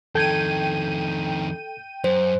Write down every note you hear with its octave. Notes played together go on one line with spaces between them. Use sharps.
F2 D#3 A4 G5 G#6 D#7
F#2 C5